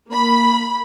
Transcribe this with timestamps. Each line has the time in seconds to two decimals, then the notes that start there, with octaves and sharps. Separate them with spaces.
0.11 A#3 B5